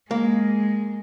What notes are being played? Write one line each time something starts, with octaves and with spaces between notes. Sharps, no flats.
G#3 A#3